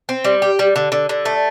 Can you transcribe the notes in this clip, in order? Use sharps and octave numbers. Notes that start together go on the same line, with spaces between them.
C4
G3
G4
G3
D3
D3
D3
A3